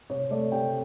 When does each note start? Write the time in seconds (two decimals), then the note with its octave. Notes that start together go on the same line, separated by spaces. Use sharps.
0.10 C3 C#5
0.30 A3 D5
0.52 C3 G5